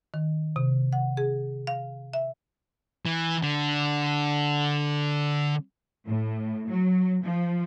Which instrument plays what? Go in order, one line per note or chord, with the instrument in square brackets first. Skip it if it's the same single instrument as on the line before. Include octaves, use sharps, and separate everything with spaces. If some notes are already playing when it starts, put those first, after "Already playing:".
[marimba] D#3
C3
F#5
G#4
F5
E5
[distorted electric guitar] E3
D3
[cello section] A2
F#3
F3